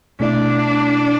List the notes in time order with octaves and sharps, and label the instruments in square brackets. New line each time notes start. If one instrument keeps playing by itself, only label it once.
[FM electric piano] B2 A3 E4 D5 [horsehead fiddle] D4